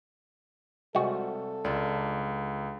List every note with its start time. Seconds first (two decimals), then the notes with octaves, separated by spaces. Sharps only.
0.95 C3 G3 G#3 F4 F#4 A4
1.64 C#2 D4 F4 D5